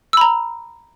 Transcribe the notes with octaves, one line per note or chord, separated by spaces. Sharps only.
A#5 B5 E6